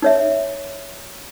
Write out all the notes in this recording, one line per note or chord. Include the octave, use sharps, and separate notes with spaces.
D#4 C#5 E5